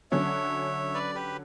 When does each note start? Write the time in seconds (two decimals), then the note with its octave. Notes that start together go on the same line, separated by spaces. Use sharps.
0.11 D3 F#3 C#4 C#5 E5
0.94 B4 D5
1.15 G4 B4